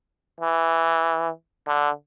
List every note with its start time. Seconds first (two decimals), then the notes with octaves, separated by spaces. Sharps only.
0.40 E3
1.67 D3